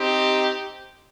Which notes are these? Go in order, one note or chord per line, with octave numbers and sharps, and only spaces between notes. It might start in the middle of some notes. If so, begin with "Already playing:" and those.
Already playing: C4 D#4 G4